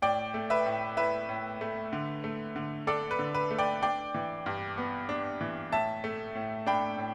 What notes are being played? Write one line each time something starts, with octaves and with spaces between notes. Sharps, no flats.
A2 D5 G5
A3
B4 E5
A2
E4 B4 E5
A2
A3
D3
A3
D3
D4 A4 D5
B4
D3
B4
A3
D5 G5
D4 D5 G5
E3
G2
B3
D4
E3
A2 E5 A5
A3
A2
D4 G5 B5
A2